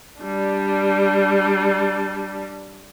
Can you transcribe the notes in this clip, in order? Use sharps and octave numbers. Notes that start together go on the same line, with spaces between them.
G3 D4